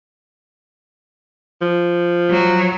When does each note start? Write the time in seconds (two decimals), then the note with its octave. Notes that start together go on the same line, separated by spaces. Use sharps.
1.62 F3
2.30 F#3